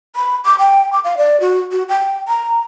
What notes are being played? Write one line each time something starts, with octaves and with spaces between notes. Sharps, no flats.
B5
D6
G5
D6
F5
D5
F#4
F#4
G5
A#5